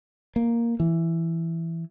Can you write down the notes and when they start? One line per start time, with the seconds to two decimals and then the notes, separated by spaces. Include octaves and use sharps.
0.36 A#3
0.80 E3